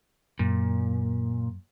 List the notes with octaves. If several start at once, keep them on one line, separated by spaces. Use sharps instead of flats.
F#2 A#2